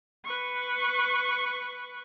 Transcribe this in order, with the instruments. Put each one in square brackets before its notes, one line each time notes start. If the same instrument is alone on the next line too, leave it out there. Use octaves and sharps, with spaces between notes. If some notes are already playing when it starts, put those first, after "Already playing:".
[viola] B4 C#6